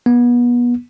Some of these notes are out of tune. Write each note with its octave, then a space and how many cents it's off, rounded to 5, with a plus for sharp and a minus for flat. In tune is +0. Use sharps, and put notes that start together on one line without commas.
B3 -30